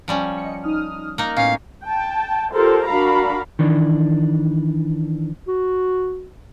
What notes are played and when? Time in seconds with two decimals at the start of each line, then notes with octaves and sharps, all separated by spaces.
0.08 F3 G3 C#4
0.37 D#5 C#7
0.63 D#4 D#6 F6
1.18 A#3 D#4 F6 F#6
1.37 A2 B3 C#4 F5
1.84 G5 A5
2.53 F4 G4 A4 A#4 C5
2.86 D4 F#4 A#4 F5 A#5 B5
3.59 D#3 E3 D4
5.48 F#4